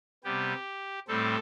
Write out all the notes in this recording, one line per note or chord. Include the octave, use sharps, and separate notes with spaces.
C3 G3 B3 G4
A2 G3 C4 A4